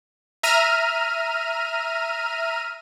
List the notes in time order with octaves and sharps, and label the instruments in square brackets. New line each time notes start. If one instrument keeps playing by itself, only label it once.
[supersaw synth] E5 A#5 F6 D#7